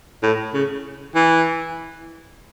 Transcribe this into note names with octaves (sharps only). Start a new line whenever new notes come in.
A2
C#3
E3